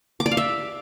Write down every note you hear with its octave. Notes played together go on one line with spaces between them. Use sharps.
D6
D5
F5
E5